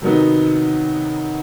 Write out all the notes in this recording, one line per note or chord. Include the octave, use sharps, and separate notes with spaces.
C3 D#3 F#3 B3 D#4